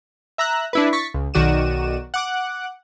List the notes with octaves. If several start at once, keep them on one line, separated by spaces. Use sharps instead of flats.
E5 A#5 E6 F#6
D4 E4 B4
C#6 A6 B6
C#2
B1 D#3 F#4 D5 D#7 E7
F#5 D6 F#6